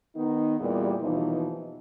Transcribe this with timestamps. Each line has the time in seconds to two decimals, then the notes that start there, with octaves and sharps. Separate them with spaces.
0.16 D#3 B3 D#4
0.60 E2 A#2 E3 G3
1.01 D#2 B2 E3 F3 D#4